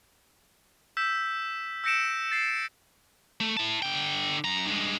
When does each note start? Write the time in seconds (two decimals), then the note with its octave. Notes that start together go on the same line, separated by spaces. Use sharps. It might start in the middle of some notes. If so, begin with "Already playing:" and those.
0.97 E6 G6 B6 E7
1.84 E6 G6 A#6 C#7 D7 E7
2.32 A6 C7
2.48 C#7
3.40 A3
3.57 E4 A5
3.82 D3 G5
4.44 F#2 A#5
4.67 G2 G#3